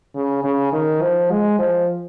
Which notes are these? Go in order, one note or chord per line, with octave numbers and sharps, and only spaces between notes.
C#3
C#3
D#3
F3
G#3
F3